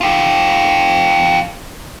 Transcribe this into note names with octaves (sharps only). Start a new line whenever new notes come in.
F4 G4